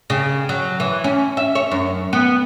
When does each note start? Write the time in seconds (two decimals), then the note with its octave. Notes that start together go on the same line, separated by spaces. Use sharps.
0.10 C#3
0.49 F#3
0.80 E3
1.04 C#4
1.37 E5
1.55 C#5
1.71 F#2
2.13 B3